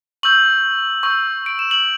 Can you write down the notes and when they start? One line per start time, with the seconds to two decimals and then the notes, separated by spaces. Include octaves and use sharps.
0.23 C#6 E6 G6 F#7
1.03 C#6 E6 G6
1.46 D7
1.59 E7
1.71 F#7